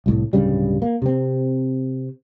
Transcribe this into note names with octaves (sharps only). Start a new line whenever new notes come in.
C2 A2
D1 G2 C#3 G3
A#3
C3 C4